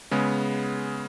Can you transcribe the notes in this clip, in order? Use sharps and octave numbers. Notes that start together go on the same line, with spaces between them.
C#3 G#3 B3